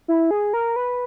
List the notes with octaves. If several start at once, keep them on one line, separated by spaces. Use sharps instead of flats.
E4
G#4
A#4
B4